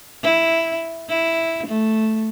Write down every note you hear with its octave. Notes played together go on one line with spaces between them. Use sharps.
E4
E4
A3